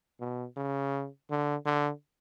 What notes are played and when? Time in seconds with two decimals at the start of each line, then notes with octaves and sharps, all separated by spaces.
0.20 B2
0.57 C#3
1.31 D3
1.66 D3